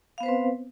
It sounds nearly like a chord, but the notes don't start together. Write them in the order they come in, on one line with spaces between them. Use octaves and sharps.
F5 B3 C5 B4 C4